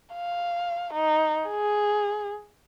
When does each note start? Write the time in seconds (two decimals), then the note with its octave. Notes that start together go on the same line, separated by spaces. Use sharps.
0.14 F5
0.93 D#4
1.49 G#4